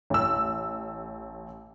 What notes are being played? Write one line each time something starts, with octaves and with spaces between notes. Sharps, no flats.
A1 E6